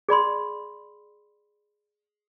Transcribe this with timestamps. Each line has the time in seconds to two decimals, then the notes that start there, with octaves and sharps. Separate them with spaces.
0.09 G#4 D5 B5 C6